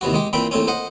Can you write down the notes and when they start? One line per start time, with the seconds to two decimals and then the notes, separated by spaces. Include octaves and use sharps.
0.01 D#2 C3 E3 F#4
0.14 G#3 G4
0.33 A#2 E3 C4 G5 B5
0.51 A#1 A2 C4 C#4
0.68 C5 D#5 F#5